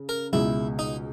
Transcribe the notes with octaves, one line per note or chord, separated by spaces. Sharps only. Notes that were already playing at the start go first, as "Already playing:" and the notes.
Already playing: C#3
A#4
C#2 B2 G#3 E4
D#4